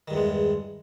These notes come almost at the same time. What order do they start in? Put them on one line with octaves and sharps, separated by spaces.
D#3 G2 E2 G#3